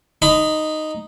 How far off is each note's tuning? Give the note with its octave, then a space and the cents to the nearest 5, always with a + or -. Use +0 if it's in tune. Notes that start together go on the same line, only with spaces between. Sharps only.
D#4 -5 B5 +30